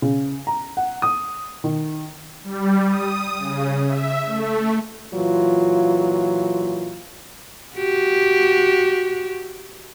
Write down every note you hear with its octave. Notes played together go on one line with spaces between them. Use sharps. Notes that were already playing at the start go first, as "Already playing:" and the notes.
C#3
A#5
F#5
D#6
D#3
G3
D#6
C#3
E5
A3
A#2 E3 F#3 F4
F#4 G4